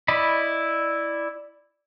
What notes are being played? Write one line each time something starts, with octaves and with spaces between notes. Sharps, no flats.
E4 D5 D#5 B5